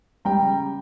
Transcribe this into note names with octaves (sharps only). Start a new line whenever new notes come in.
G3 G5 A#5
C#3